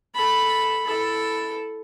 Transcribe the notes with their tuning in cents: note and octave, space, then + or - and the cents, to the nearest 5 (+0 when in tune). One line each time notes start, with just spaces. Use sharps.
A4 +0 B5 +0
E4 +0 A4 +0